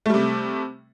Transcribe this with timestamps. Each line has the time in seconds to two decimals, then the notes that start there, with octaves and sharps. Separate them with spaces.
0.06 A3
0.10 G3
0.14 C3